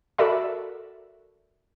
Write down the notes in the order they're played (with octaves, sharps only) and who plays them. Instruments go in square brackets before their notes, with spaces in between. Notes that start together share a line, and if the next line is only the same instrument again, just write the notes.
[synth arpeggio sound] F#4 A4 A#4 D5 E5 B5